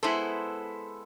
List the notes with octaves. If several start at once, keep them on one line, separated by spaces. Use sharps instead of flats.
G#3 B3 E4 A4 C5